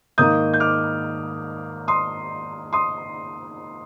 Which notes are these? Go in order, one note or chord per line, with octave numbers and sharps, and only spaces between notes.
G#2 D#3 A#3 D#4 D#6 G6
G6
D6 F6
C6 D#6
C6 D#6